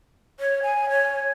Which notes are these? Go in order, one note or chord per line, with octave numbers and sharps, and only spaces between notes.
C#5
G#5
C#5